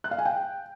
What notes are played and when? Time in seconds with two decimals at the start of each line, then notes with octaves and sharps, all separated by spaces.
0.04 F#6
0.11 F5
0.18 G#5
0.26 G5